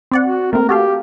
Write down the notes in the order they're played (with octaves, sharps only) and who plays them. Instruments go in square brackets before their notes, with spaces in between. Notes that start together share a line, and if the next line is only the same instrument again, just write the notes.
[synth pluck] C4 D5 F#5
[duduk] F#4
[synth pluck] A3 A#3 C4 [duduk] A#4
[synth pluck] F#4 A4 F5 [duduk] G4